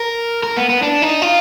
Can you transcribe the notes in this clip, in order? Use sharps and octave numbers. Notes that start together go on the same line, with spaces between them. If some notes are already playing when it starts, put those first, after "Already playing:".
Already playing: A#4
A#4
B3
B3
D4
D#4
F4